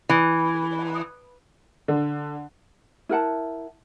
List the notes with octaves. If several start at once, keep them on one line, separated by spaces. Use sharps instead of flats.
E3
D3
E4 A#4 F#5 A5